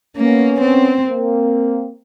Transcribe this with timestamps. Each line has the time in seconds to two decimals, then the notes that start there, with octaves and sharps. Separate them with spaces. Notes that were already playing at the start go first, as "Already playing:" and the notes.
0.17 A#3 B3 C#4
0.61 C4
1.07 A#3 C4